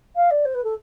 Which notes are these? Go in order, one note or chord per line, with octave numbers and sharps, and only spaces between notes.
F5
D5
C5
B4
A4